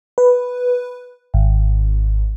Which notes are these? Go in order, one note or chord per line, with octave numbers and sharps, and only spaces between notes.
B4
G#1